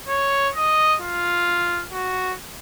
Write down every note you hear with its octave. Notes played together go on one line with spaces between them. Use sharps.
C#5
D#5
F4
F#4